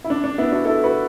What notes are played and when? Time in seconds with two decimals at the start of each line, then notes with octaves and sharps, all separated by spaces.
0.04 E4
0.10 D4
0.24 D4
0.38 B3 E4
0.51 D4 F#4
0.65 E4 A4
0.83 F#4 B4